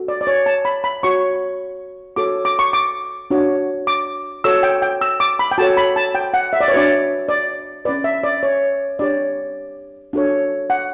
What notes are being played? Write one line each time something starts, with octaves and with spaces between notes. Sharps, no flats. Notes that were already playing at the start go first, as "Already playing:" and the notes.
Already playing: F#4 A4
D5
D5
C#5
A5
B5
B5
F#4 C#5 C#6
F#4 A4 C#5 D6
D6
C#6
D6
D4 F#4 C#5
D6
F#4 A4 C#5 E6
G5
G5
E6
D6
B5
G5
F#4 A4 C#5 A5
B5
A5
G5
F#5
E5
D5
C#5
D4 F#4 B4 D5
D5
C#4 E4 B4 D5
E5
D5
C#5
D4 G4 C#5 D5
D4 F#4 A4 C#5
F#5